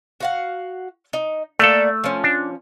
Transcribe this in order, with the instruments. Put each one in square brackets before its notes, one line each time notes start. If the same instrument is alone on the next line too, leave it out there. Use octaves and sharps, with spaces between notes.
[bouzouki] F#4 F5 F#5
D#4
[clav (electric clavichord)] A3 A4 [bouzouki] A#3 A#4 D5
[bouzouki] F3 C#4
[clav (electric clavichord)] D4